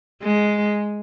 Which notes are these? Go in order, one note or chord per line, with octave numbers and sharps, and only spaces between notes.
G#3